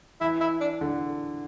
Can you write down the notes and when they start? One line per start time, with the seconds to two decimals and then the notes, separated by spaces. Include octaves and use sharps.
0.21 E3 E4
0.40 E4
0.60 D4
0.81 D3